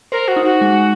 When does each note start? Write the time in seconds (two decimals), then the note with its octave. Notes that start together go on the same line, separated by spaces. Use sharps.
0.12 A#4 C5
0.28 F#4
0.36 D#4
0.45 F#4
0.61 G#3